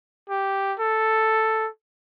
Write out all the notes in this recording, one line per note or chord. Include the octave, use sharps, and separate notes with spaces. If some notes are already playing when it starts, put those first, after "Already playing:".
G4
A4